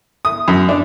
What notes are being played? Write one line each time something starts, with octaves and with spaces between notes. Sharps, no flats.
D#6
F#2
D4